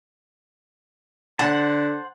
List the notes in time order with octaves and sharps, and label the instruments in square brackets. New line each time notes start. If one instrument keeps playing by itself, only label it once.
[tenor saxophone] D3 [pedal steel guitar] C5 A5 [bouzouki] F#5